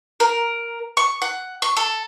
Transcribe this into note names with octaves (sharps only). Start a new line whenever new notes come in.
A#4
C#6
F#5
C#6
A4